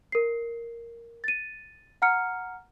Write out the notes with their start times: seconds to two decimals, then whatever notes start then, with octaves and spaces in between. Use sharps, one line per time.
0.12 A#4 C7
1.24 A6 D#7
2.02 F#5 A#5 F6 C#7